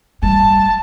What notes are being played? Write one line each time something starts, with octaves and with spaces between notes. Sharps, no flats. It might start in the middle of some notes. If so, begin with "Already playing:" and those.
G3 A5